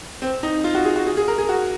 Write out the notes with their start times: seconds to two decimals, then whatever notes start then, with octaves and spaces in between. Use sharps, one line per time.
0.22 C4
0.43 D#4
0.64 F4
0.75 F#4
0.85 G#4
0.96 F#4
1.07 G#4
1.17 G#4
1.28 A#4
1.38 G#4
1.49 F#4